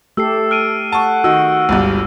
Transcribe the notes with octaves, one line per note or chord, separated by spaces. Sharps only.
A3 G4 A4 E6 C7
F6 D7 D#7
F#5 A5 C#6
D#3 F#4 E6
G1 C#2 G2